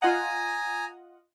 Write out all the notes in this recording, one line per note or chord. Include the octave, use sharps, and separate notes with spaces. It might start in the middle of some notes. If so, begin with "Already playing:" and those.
F4 D#5 F#5 G#5 A#5 D#6